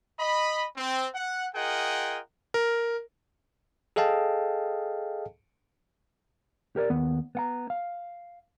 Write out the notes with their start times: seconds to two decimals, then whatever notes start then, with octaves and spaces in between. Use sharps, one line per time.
0.20 D#5 B5
0.77 C4
1.14 F#5
1.54 F4 G#4 A#4 D#5 F#5 G5
2.54 A#4
3.96 G#4 A4 D#5 F5 G5 A5
6.76 G4 A#4 C#5 D5
6.90 D#2 B3
7.35 B3 F#5 A#5
7.70 F5